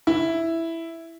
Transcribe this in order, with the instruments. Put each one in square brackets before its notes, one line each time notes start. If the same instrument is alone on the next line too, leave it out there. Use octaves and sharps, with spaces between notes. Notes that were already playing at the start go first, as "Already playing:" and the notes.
[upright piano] E4